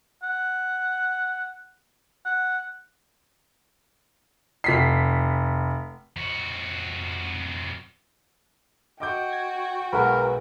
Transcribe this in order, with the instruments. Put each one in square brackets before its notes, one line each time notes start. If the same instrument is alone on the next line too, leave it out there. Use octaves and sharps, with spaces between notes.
[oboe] F#5
F#5
[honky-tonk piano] F1 B6 C7
[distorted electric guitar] F2 F#4
[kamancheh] F#4 G5 [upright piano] D#5 D6 G6
[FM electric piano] G#6
[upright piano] B1 G#3 B5 [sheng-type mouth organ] A#4 [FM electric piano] B4 F#5